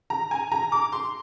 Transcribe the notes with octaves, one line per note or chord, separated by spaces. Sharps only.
A#5
G#5
A#5
D6
C6